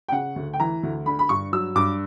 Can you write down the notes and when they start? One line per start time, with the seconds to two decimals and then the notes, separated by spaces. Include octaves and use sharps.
0.08 G5
0.12 C#3 F#5
0.36 D2
0.53 G5
0.60 E3 A#5
0.83 D2
1.06 D3 B5
1.19 B5
1.29 G2 C#6
1.52 F#3 E6
1.76 G2 D6